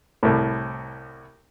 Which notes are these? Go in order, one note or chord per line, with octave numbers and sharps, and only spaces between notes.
C2 A2